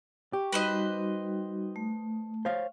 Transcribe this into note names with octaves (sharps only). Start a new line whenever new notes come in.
G4 C#6
G3 D#4 F#4 B4 C5 D#5
A3
C5 C#5 F5